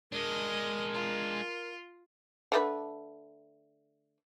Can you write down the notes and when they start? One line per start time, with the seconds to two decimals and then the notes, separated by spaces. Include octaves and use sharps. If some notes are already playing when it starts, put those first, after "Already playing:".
0.12 G#3 D4 A#4 D#5
0.94 F4
2.52 D3 A3 B4